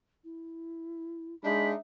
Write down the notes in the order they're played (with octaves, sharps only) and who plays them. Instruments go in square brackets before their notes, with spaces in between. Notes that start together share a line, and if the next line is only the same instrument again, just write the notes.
[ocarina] E4
[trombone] G#3 [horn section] D4 D#4 [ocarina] E5 [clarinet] B5